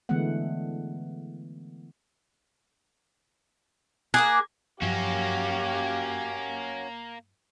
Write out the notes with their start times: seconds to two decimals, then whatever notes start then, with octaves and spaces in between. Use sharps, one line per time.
0.09 D3 E3 G#3 A3 B3 F#5
4.14 A#3 G#4 D6 F#6
4.82 G2 F3 F#3 A#3 C#4 F#4 G4 F5